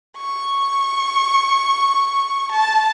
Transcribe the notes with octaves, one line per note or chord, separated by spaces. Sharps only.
C#6
A5